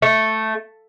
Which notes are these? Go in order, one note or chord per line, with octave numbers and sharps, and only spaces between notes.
A3